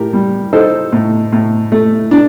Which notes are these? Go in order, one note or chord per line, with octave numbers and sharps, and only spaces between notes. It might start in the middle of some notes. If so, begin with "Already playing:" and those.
Already playing: A2 G4 A#4
G3
D#4 A4 C5
A2
A2
A3
D4